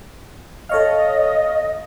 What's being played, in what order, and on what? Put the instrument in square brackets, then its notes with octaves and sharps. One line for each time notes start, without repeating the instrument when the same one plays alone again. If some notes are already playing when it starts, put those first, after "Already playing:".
[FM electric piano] A4 C#5 F5 [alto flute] D#5